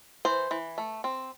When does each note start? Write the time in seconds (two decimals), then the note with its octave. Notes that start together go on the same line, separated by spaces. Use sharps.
0.25 E3 C5
0.51 E3
0.78 A3
1.04 C4